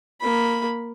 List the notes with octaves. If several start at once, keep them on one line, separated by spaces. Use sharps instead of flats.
A#3 B5